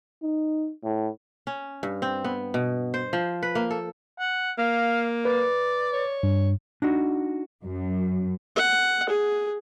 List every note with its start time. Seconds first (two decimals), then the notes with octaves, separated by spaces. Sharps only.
0.23 D#4
0.84 A2
1.47 C#4
1.83 G2
2.02 C4
2.25 B3
2.54 B2
2.94 C5
3.13 F3
3.43 B4
3.55 A#3
3.71 A4
4.19 F#5
4.58 A#3 F5
5.25 B4 D5
5.93 C#5
6.23 G2
6.82 D4 D#4 F#4
7.64 F#2
8.56 F#5
9.09 G#4